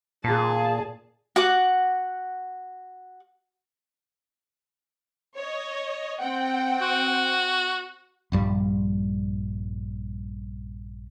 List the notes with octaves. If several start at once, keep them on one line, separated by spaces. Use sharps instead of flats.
A#2 G#4 A5
F#4 F#5 D6
C#5 D#5
C4 F#5 G5
F#4
A#1 G2 G3